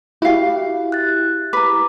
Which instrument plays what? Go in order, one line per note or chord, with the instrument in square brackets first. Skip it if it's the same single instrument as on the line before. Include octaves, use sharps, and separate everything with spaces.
[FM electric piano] E4 G4 [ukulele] F#4 F5
[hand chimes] F#6 A6
[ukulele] B4 [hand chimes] A#5 D6